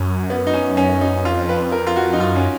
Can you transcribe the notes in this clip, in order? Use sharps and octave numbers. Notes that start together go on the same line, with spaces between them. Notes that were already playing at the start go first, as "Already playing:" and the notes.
Already playing: F#2 C#4
B3
D#4
C#4
C#4
D#4
F2 F4
B4
A#4
F4
F#4
D#4
F#2 F4
C#4